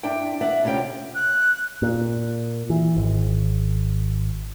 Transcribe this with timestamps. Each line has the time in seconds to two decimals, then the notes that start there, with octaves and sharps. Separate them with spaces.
0.03 G2 D4 E4 G5
0.41 D5 E5 F#5
0.64 D2 C3 C#4 F4 G5
1.15 F#6
1.82 A#2
2.70 E3
2.96 G#1